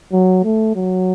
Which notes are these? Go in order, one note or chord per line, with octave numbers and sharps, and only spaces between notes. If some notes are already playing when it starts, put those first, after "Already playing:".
F#3
A3
F#3